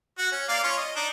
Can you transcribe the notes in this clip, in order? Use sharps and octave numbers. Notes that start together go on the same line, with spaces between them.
F#4
C#4
A#3 D5 F5
C#4 F4 C#5
D#5
D4 D#4